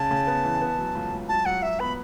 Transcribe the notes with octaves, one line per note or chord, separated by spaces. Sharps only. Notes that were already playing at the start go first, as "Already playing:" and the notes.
Already playing: C#3 A5
C#3
B3
E3
B3
F#3
C#2
C#2
F#3 A5
F#3 F#5
F#3 E5
B3 B5